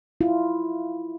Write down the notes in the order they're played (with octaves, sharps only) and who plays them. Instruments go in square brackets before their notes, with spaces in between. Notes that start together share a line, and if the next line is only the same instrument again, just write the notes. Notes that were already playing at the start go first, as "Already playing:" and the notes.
[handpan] E4 F4